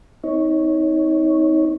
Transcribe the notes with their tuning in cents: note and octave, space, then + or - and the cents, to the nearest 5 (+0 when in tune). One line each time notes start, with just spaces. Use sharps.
C4 -20 D#4 +30 C#5 +0